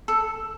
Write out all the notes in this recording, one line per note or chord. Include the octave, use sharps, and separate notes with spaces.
A4